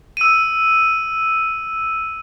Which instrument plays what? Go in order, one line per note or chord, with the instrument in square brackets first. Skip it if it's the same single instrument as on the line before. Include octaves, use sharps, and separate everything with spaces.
[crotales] E6 D#7